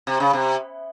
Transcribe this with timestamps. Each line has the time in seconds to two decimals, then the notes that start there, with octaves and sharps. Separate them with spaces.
0.07 C3
0.20 C#3
0.33 C3